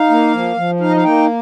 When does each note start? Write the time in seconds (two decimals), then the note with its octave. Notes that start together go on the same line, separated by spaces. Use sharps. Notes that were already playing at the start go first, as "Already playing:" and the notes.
Already playing: D#4 F5
0.10 A#3
0.33 F3
0.57 F3
0.80 D#4 F5
0.89 D#5
0.96 F5
1.04 A#3 G5